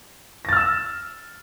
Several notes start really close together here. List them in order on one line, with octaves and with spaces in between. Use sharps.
A#6 A6 F6 E6 E7